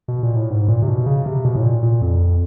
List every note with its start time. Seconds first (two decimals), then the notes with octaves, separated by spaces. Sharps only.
0.08 B2
0.23 A#2
0.36 A2
0.50 G#2
0.68 A#2
0.82 C3
0.88 B2
1.06 C#3
1.26 C3
1.45 B2
1.56 A2
1.63 A#2
1.83 A#2
2.02 F2